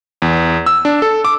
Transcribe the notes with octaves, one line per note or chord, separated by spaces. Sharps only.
E2
E6
D4
A4
D6